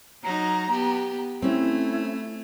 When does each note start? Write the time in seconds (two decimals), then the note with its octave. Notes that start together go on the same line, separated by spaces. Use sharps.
0.23 F#3 D#4 A#5
0.71 B3 G4
1.42 A3 C4 C#4 E4